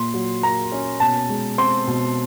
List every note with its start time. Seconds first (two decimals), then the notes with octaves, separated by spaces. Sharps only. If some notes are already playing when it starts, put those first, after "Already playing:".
Already playing: A#2 C6
0.14 F#3
0.43 A#3 A#5
0.72 C#4
1.00 B2 A5
1.29 G#3
1.58 C4 C6
1.87 B2